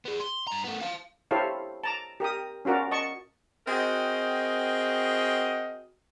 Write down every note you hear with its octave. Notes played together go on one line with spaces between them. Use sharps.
B3 G#4
C6
G2 A#5
A3 B3
F5 A5
E4 G4 A4 C5 C#5 F5
A5 A#5 D6
G4 A#4 G5 D#6
C#4 F4 F#4 A#4 D5
D#5 A5 C#6
C4 F#4 G#4 A#4 D#5 G5